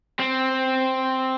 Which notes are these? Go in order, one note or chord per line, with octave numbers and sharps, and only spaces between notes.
C4